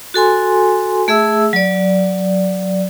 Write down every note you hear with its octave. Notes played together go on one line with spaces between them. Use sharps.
F#4 A4 G#5 C6
A3 G#4 E5 E6
F#3 D5